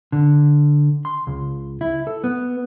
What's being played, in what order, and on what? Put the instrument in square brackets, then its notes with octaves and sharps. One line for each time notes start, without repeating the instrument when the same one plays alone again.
[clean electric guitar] D3
C6
C#2
E4
A4
B3